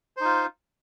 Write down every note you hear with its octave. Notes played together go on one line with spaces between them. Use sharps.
D#4 F4 C5